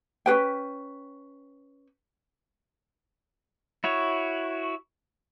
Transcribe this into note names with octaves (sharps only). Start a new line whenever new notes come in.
C#4 G#4 B4 G5
E4 F#4 C#5